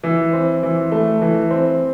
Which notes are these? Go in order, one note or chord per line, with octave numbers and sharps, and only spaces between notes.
E3
C4
E3
A3
E3
C4